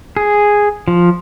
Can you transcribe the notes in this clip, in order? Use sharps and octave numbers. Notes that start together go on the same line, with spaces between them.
G#4
F3